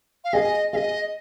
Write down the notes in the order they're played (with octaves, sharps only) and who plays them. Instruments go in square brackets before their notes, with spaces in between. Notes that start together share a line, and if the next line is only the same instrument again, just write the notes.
[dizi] F5
[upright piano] G#4 [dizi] D#5
[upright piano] G#4 [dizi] D#5 F5